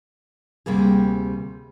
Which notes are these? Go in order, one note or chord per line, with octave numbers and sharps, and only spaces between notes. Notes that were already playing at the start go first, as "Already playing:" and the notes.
D2 C3 G3 A#3 G#4